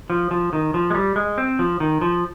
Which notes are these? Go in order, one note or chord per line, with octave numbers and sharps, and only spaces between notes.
F3
F3
D#3
F3
G#3
G3
G#3
C4
F3
D#3
F3